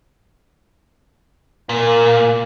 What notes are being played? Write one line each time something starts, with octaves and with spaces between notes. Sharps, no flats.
A#2 A#3